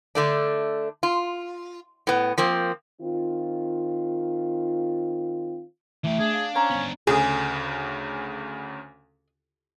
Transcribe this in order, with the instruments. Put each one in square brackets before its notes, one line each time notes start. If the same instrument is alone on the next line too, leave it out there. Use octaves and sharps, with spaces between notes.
[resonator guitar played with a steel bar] D3 A3 D4
F4
A2 B3
F3 A#3 C4
[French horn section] D#3 C4 F4
[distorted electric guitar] E3 G4 [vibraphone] A3 E5
[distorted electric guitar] D4 [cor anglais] G#4
[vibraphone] F5
[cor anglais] C#4 [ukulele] C5 A#5
[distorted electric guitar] B3 D4
[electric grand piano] D2 C#3 [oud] G#4